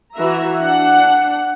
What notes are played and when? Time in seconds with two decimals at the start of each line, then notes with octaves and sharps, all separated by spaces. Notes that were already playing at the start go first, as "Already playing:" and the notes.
0.14 E3 F#4 E5 A#5
0.60 D4 F#5